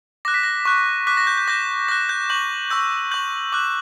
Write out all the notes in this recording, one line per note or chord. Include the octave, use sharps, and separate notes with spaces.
D6 F#6 A#6
B6
A#6
C#6 F#6
D6 F#6 B6
A#6
G6
G6
D6 G6 A#6
D6 F#6 A#6
G6
C#6 G6 F#7
C#6 E6 G6
C#6 G6 F#7
D6 F#6 F#7